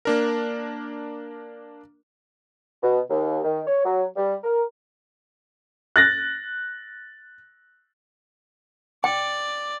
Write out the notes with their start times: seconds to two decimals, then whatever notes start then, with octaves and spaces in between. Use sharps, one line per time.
0.05 A#3 D4 A#4
2.83 B2
3.10 D#2
3.44 D#3
3.67 C#5
3.85 F#3
4.16 G3
4.44 A#4
5.96 F#6 A6 A#6
9.04 D5 G5